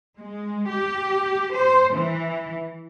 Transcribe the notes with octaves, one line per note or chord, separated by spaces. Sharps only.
G#3
G4
C5
E3